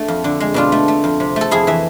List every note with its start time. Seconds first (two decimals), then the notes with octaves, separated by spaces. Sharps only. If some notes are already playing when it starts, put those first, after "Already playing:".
Already playing: A3 D4
0.08 F2
0.24 D3
0.40 G#3
0.54 B2 D4 F4
0.72 A3
0.88 A3
1.04 F2
1.20 C3
1.36 A3 A4
1.51 F2 E4 G#4
1.67 E3 E5